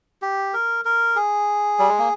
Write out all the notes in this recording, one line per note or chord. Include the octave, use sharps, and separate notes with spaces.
G4
A#4
A#4
G#4
G3
G#3
A#3